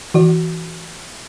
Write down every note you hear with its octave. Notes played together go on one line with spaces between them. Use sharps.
E3 F#4 D5